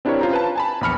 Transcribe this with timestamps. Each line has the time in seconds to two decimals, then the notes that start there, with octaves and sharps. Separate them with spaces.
0.05 C4 D4 E4 G4 A#4 C#5
0.21 C#4 F4 C5 A#5
0.33 B4 A5
0.56 G#5 A5 B5
0.81 A#1 E2 B5 F6 C#7